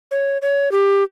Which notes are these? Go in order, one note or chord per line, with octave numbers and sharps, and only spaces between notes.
C#5
C#5
G4